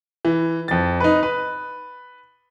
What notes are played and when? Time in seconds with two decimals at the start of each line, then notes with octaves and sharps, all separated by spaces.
0.25 E3
0.68 F2 A6
1.00 D#4 B4
1.23 B4